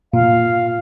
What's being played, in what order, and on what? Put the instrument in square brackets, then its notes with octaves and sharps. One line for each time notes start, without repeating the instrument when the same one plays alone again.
[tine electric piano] A#2 [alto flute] F5